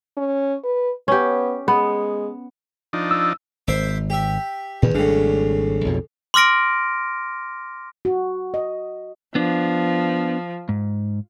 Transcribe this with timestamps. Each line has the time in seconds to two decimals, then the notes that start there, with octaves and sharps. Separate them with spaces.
0.17 C#4
0.64 B4
1.08 B3 C#4 G4
1.68 G#3 B3
2.93 F3 D4 D#4
3.11 E6
3.68 G#1 C5 E5 D6
4.10 G4 E5
4.82 E2 A#2 D#3
4.95 G#1 A2 C#3 G3 D4
5.85 B1 F2 B2
6.34 C6 D6 F6 A#6 D7
8.05 F#4
8.54 D#5
9.35 F3 B3 D4
10.69 G#2